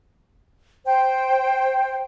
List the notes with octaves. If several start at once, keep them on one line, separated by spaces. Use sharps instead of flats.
C5 G5